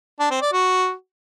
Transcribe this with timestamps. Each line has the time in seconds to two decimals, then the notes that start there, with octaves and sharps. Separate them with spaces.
0.20 D4
0.30 C4
0.41 D5
0.52 F#4